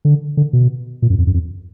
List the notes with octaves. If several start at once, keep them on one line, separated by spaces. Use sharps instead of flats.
D3
D3
B2
A#2
F#2
F2
F#2
F2